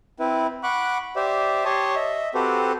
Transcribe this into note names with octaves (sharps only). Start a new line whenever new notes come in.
C4 E4 B4
F#5 B5 C#6 D6 F#6
G4 C5 D5 E5
G4 C#5 A5 C6 C#6 D#6
D#5 E5
C4 F#4 G4 A4 B4 C5